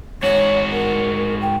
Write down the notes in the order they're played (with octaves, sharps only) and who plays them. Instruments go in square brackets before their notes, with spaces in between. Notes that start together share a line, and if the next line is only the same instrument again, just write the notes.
[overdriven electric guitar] G#2 F#4 [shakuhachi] C#5
[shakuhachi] A#4
G5